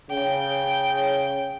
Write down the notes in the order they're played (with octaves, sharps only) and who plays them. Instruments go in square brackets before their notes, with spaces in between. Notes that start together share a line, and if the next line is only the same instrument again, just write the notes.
[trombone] C#3 [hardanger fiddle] G5